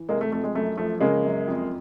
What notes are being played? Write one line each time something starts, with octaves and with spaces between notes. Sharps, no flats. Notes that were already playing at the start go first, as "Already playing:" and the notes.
Already playing: E3
C3 G#3 A#3
A3
F2 A3
G#3
F#2 A3
F3 A3
C#3 G#3 A#3
F#2
F2